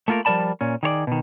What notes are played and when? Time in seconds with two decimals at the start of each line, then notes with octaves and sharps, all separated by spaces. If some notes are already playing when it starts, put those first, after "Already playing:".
0.08 A3 A#3 F4 F#4 A#4
0.25 F3 G3 A#4 D5 A5 B5
0.61 A#2 C#4
0.83 D#3 G#4 C#5 D5
1.07 B2 D#3